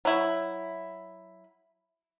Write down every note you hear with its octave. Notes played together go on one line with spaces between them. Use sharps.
F#3 E4